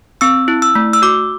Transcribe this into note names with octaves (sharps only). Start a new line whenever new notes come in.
C4 E6
E4
E6
A3
E6
F#4 D6